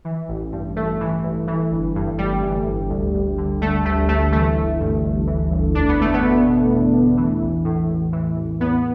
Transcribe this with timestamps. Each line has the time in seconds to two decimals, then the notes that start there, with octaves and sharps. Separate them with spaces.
0.05 E3
0.28 A1
0.52 G2
0.76 A1 A3
1.00 E3
1.24 A1
1.47 E3
1.71 G1
1.95 G2
2.18 G1 G3
2.42 E3
2.66 G1
2.90 D2
3.14 D2
3.38 D3
3.61 D3 A3
3.85 D2 A3
4.08 D2 A3
4.32 E3 A3
4.56 G1
4.80 G2
5.04 G1
5.27 E3
5.51 G1
5.75 E2 D4
5.89 B3
5.99 E2 A3
6.14 B3
6.22 B2
6.46 B2
6.70 E2
6.93 E2
7.17 E3
7.41 A1
7.65 A2
7.89 A1
8.13 E3
8.36 A1
8.60 E2 B3